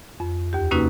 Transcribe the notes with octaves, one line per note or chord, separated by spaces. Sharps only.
F2
D#2 G4
C3 A#3 C#4 D#4 F#4 B4